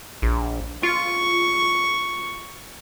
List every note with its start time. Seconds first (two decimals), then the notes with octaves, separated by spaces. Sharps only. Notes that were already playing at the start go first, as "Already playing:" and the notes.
0.22 A#1
0.83 F4 C#6